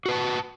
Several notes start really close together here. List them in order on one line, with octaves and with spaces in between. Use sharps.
F#4 B4 A5